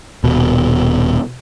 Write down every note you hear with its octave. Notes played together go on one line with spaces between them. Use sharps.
D#1 B2